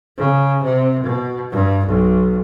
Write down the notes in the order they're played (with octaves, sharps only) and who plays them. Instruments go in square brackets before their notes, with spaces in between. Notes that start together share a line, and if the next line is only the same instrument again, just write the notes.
[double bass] C#3
C3
B2
G2
B1